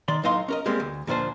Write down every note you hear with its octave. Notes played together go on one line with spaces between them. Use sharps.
D#3 D5 C6
A2 F#3 D#4 D#5 F5 C6
C#4 A#4 D#5
G3 G#3 A#3 C4
D2
D2 A#2 F3 D4 C5